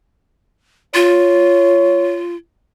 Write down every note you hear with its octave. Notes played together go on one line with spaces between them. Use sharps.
F4 C#5